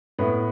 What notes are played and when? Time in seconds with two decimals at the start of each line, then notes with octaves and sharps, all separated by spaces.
0.19 A2 B3